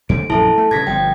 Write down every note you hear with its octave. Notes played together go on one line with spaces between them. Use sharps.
F2 D3 A3 D7
A#1 F#2 E3 E4 A4 A5
A3
G2 C#3 G#6 A#6 B6
G1 F3 G5